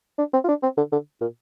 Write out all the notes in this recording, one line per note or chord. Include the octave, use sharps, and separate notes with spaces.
D4
C4
F4
D4
C4
D3
D3
A#2